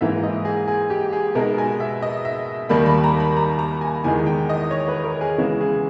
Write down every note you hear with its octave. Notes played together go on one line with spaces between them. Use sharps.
G#2 E3 A#3 E5
D#5
G#4
G#4
G4
G#4
B2 G#3 D#4 A#4
G#5
E5
D#5
E5
D#2 D#3 G3 A#3 B5
B5
A#5
B5
A#5
A#5
G#5
E2 D#3 G#3 G#5
G5
D#5
C#5
B4
A#4
G#4
C#3 E3 G#3 B3
G#4